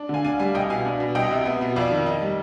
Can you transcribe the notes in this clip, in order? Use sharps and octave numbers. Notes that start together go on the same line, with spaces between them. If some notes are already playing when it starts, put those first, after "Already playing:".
Already playing: D4
D3 F5 G#5
D4 F5 G#5
G3 F5 G#5
C2 D#5 G5
B2 F5 G#5
D4
B2
C2 D#5 G5
C3
B3
B2
F2 D5 F5
D#3
D#4
G3